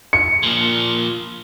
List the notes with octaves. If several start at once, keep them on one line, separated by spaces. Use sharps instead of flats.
C#7
A#2 F3